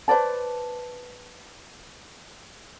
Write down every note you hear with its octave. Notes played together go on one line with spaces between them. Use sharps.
B4 C5 D5 A5